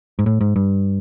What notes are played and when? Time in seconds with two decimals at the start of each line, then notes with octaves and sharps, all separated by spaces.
0.19 G#2
0.26 A2
0.41 G#2
0.56 G2